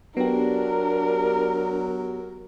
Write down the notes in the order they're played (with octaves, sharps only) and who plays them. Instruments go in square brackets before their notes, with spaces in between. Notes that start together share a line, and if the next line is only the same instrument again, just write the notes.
[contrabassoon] F#3 [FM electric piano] B3 G4 [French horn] D4 [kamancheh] A#4